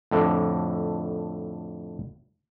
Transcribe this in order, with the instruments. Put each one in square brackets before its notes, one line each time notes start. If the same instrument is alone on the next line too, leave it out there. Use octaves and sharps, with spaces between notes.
[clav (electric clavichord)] F2 A2 D3